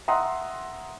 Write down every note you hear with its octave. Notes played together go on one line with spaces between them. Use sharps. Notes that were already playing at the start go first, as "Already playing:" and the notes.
E5 F#5 A#5 C6 D#6